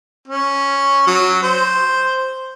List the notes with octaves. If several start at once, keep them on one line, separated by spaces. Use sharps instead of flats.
C#4
F#3
C5